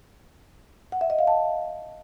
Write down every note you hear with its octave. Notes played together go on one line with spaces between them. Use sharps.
F#5
E5
D#5
F5
A5